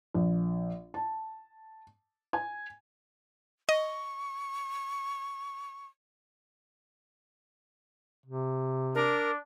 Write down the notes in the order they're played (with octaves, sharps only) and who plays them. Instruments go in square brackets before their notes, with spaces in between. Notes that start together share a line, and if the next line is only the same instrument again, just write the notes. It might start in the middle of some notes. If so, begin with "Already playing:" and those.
[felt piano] A#1
A5
G#5
[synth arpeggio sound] D#5 [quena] C#6
[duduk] C3
[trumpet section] D4 [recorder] A#4